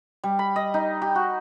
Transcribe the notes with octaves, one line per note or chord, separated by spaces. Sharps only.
G3
B5
D#5
D#4
G4
F#4